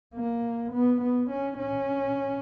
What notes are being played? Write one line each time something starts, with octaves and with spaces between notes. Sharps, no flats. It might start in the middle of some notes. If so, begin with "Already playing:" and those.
A#3
B3
B3
C#4
C#4